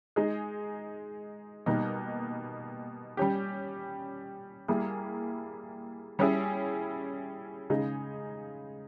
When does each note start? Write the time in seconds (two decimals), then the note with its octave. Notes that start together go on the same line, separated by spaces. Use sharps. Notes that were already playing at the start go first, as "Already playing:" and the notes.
0.16 G#3 D#4 G#4
1.66 B2 G3 A#3 D#4
3.17 G3 C#4 G4
4.68 G3 A#3 E4 G#4
6.19 G3 C#4 E4 G#4
7.70 C#3 G#3 D#4 G#4